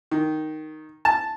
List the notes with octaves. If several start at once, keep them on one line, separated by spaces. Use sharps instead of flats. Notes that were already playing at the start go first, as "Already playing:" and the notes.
D#3
A5